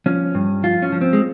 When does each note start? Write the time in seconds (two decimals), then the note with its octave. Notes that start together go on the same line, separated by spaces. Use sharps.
0.06 F3 C#4
0.35 G2
0.63 F3 F4
0.82 C#4
0.92 F3
1.01 C4
1.13 G#3